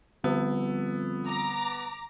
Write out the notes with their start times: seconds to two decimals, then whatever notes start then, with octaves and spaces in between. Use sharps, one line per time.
0.24 F2 D3 G3 B3 E6
1.28 A#5 D6